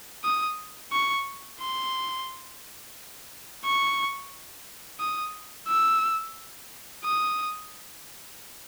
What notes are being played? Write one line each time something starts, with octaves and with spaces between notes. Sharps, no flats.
D#6
C#6
C6
C#6
D#6
E6
D#6